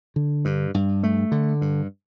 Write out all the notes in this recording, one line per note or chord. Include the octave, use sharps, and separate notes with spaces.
D3
G2
G2
A3
D3
G2